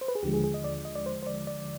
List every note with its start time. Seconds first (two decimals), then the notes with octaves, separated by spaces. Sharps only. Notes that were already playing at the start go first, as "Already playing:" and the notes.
0.01 C5
0.08 B4
0.15 G#4
0.23 D#2 D3 F3 G#3 G4
0.34 G#4
0.44 G#4
0.54 D#5
0.64 D5
0.85 D#5
0.95 D5
1.06 C5
1.23 C5
1.27 D5
1.47 D5